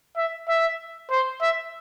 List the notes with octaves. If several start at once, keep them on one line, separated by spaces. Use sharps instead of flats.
E5
E5
C5
E5